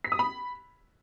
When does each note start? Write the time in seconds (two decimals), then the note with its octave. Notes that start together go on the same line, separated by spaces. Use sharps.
0.04 B6
0.12 D#6
0.19 B5